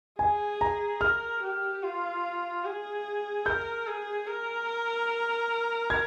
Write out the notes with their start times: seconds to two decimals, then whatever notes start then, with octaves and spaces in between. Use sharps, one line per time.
0.19 G#4 G#5
0.61 A#5
1.01 A#4 F6
1.43 G4
1.83 F4
2.64 G#4
3.46 A#4 G6
3.87 G#4
4.27 A#4
5.90 G#6